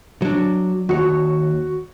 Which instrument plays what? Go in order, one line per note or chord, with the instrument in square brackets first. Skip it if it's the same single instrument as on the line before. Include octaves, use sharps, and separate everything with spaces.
[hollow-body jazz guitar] F#3 D4
[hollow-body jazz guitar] D#2 C#5 [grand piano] F#4